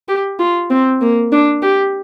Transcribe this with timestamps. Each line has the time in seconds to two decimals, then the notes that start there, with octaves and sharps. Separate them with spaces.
0.08 G4
0.39 F4
0.70 C4
1.01 A#3
1.32 D4
1.62 G4